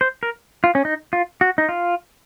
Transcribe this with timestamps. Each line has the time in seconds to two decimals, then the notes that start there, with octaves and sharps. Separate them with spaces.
0.01 C5
0.23 A#4
0.64 F4
0.75 C#4
0.85 D#4
1.13 F4
1.41 F#4
1.58 D#4
1.69 F4